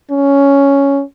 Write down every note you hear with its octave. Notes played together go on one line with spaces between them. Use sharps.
C#4